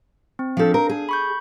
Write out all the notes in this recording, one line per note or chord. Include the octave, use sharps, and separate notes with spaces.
C4
F3 D4 A4 F5
A#4
G#4
B5 C#6 G6